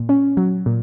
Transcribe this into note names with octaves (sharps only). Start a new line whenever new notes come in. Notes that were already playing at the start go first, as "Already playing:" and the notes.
Already playing: A#2
C#4
F#3
A#2